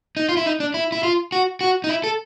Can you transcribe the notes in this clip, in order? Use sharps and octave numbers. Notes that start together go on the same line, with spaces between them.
D#4
F4
E4
D#4
D4
E4
E4
F4
F#4
F#4
D#4
E4
A4